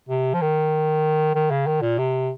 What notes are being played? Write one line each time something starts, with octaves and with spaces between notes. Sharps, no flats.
C3
F3
D#3
D#3
C#3
D#3
A#2
C3